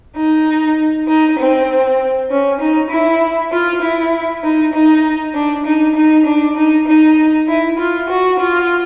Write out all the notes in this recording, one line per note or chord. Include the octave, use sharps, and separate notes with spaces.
D#4
D#4
C4
C#4
D#4
E4
F4
E4
D#4
D#4
D4
D#4
D#4
D4
D#4
D#4
E4
F4
F#4
F4